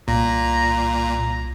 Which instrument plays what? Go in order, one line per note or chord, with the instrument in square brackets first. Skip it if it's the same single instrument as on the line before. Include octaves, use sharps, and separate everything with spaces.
[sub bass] C2 [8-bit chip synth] A#2 [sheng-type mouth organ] A#5